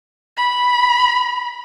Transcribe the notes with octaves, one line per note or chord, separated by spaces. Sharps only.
B5